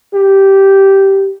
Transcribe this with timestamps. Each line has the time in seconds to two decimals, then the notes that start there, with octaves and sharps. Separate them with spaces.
0.13 G4